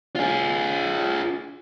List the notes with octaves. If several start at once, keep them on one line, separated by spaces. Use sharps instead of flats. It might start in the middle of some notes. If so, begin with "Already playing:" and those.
F4 G#4